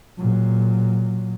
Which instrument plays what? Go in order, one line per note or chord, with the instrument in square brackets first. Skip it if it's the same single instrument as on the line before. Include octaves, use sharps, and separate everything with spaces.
[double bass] A#2 F#3